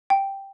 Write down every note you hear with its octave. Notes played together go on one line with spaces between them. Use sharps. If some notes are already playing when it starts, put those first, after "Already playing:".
G5